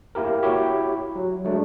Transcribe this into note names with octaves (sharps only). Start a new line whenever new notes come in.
A#3 E4 G4 A#4
E4 F#4 G4 C#5
F#3
F#3 G#3 A3 D4